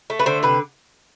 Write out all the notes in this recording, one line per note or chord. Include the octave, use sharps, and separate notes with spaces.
A3
B4
D3 C5
C3 B4